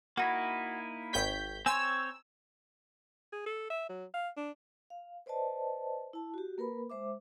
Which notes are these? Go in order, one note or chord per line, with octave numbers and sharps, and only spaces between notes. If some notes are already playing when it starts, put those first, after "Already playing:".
A#3 D#4 E4 F#4 B5
G#1 C#5 G5 G6 B6
C4 C#5 G#5 A#5 C6 E6
G#4
A4
E5
F#3
F5
D4
F5
B4 C5 D5 D#5 A5
E4 A5
F#4 G4
A#3 A#4 B4 B5
G#3 C5 E5 D6